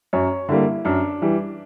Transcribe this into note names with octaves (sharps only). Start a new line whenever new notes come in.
F#2 C#5
D3 G3 A#3 E4
F#2 D4
E3 G3